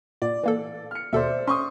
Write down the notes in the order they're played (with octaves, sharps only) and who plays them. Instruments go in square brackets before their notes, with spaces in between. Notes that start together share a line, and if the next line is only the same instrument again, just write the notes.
[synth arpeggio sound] A#2 [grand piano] D5
[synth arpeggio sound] E3 A#3 A4
[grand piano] F6 C#7
[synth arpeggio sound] D#2 B2 A4 [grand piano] C5 D5 E5
[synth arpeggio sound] C#4 [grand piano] C6 C#6 D#6